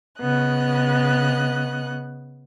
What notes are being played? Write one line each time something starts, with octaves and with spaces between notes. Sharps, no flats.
C#3 B3 D#5 F#6